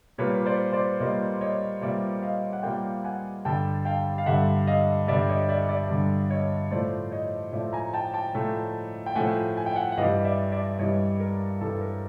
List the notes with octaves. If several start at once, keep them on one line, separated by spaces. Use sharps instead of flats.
A#2 G3 A#3 B4 C#5
C5 D5
C5 D5
A#2 G3 A#3 C#5 D#5
C#5 D#5
A#2 G3 A#3 D5 E5
D#5 F5
F#5
A#2 G3 A#3 F5 G5
F#5 G#5
G2 D3 G3 G5 A5
F5 G5
F5
G2 D3 G3 E5 F#5
D#5 F5
G2 D3 G3 D5 E5
C#5 D#5
D5 E5
D5 E5
G2 D3 G3
C#5 D#5
A2 F3 A3 C5 D5
C#5 D#5
A2 F3 A3 D5 E5
G#5 A#5
G5 A5
G5 A5
A2 F3 A3
G5
A2 F3 A3 F#5 G#5
G#5
G5
F#5 G#5
F#5
G2 E3 G3 D#5 F5
D5 E5
D5 E5
G2 E3 G3 C#5 D#5
A#4
G2 E3 G3 A4
A#4